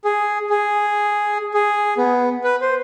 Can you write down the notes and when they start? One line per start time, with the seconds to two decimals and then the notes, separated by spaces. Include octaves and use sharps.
0.05 G#4
0.50 G#4
1.54 G#4
1.98 B3
2.44 B4
2.61 C5